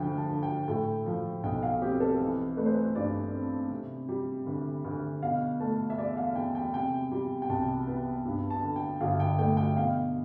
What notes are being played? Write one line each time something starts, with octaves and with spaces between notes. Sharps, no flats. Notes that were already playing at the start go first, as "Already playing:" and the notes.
Already playing: D2 F3 G5
A5
D2
G5
A2 G5
F3
B1 G5
F5
C4 G4
A4
E3
A3 B4
C5
B4
G2 D5
C4
C3
G3
D2
D2
B2 F5
A3 A5
E5
E2 D5
F5
E2 G5
G5
C3 G5
G3
G5
C2 A5
B3
G2
A5
D3
G5
G1 F5
G5
A3 G5
G5
B2 F5